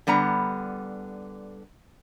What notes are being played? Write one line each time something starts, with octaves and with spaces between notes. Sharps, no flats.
D3 G3 B3 A#5